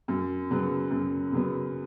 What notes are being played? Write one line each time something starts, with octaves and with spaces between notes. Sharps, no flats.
F#2
C#3 F#3 B3
F#2
C#3 F#3 B3